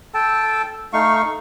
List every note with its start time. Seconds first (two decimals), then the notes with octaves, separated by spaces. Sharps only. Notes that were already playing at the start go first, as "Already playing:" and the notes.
0.14 A4 G5 A5
0.93 A3 D#4 F5 C#6